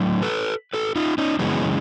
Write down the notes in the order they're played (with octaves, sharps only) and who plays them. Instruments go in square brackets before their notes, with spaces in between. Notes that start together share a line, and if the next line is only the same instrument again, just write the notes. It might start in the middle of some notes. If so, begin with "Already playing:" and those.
Already playing: [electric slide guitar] A2 F#3
A4 B4
A4 B4
D#4 F4
C#4 D#4
F#2 C#3 E3 G#3 B3 C#4